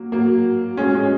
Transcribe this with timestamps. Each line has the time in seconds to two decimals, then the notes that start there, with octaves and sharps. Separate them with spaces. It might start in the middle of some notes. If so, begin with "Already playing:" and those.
Already playing: F#3 A#3
0.12 F#3 A#3
0.77 G#3 C#4
0.95 G#3 C#4